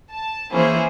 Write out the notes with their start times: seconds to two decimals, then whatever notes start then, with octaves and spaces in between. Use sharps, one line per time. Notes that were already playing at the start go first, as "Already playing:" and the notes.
0.11 A5
0.53 E3 A#3 C#4 E4 G#4 C5